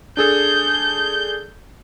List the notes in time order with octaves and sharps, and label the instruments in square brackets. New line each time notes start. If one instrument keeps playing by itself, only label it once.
[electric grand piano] D4 G#4 A4 [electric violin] G6